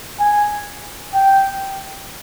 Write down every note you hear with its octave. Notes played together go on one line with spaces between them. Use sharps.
G#5
G5